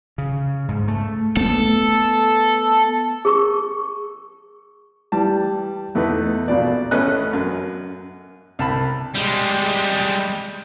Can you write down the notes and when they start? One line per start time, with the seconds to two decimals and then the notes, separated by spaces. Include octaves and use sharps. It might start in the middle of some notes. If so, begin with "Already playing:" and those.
0.18 C#3
0.68 G#2
0.88 A3
1.37 A3 B3 A4
3.25 G#4 A#4 C#6
5.12 E3 G3 A5
5.95 E2 A3 D#4 B4
6.48 A#1 B2 D5
6.91 A1 A3 C#4 B4 D#5 F#6
7.33 F#2
8.59 C2 A5 B5
9.15 G3 G#3